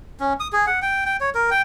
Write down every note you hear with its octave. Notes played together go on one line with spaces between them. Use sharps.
C#4
D#6
G#4
F#5
G5
G5
C#5
A#4
G5